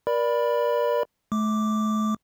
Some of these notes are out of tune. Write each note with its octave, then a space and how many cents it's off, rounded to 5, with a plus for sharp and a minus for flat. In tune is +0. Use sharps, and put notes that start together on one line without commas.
A#4 +30 D5 +0 B5 +0
A3 -35 D6 +0